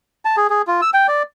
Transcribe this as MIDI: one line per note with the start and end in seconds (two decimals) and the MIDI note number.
0.25 0.36 81
0.37 0.47 68
0.50 0.62 68
0.67 0.81 65
0.82 0.90 88
0.94 1.07 79
1.08 1.23 74